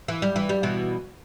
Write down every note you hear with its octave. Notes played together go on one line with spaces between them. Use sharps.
E3
G3
E3
G3
B2 E3